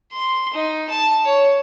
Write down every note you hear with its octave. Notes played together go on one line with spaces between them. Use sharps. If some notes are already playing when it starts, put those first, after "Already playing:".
C6
D#4
A5
C#5